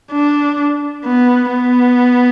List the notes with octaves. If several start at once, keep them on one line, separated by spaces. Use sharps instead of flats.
D4
B3
B3